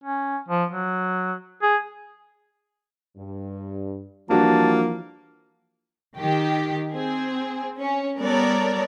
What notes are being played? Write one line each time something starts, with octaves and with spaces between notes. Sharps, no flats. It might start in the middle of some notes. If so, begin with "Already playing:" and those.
C#4
F3
F#3
G#4
G2
E3 F3 G3 A#3 D4 F#4 A5
D#3 G4
C4 G#4
C#4
G3 B3 A4 A#4 C#5 D5